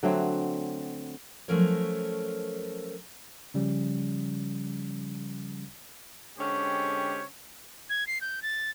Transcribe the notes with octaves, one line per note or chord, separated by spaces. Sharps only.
D3 F#3 A3 C4
F3 F#3 A3 C#4 A#4 C#5
C#3 F3 G3 C#4
D3 G#3 C4 C#4 G4 C#5
G#6
C7
G6
A6